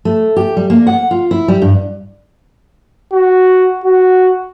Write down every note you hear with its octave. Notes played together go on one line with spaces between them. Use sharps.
A3
G4
G3
A#3
F#5
F4
E4
G3
G2
F#4
F#4